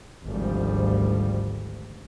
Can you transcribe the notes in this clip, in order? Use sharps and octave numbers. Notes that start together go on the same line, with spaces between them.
G#1 D2 F3 G3